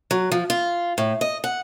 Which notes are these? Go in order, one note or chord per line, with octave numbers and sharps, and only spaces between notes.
F#3
F3
F4
A2
D#5
F#5